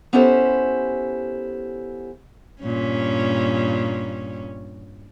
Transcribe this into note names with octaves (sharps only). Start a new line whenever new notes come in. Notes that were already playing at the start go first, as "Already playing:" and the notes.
B3 C#4 E4 G4 A4 C5
G2 A#2 C#4